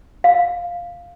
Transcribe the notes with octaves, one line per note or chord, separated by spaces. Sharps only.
F5